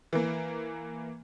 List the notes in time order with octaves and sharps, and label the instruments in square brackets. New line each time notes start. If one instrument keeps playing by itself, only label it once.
[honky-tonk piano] E3 A#3